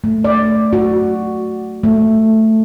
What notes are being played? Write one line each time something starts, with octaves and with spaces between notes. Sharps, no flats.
A3
D5
F#4
A3